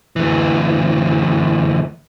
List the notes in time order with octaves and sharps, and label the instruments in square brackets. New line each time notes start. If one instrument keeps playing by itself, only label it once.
[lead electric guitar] D2 E3